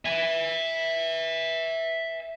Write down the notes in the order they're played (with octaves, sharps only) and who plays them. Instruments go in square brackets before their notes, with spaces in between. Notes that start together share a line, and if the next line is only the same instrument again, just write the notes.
[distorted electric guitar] E5 G#5